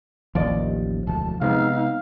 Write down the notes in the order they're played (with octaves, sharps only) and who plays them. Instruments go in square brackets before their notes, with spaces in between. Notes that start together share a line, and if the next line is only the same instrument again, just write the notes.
[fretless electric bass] A1 D#2 [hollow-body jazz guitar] F3 D5 D#5
[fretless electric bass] E1 D2 [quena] A5
[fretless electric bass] C3 G#3 B3 [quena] D#4 [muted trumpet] F5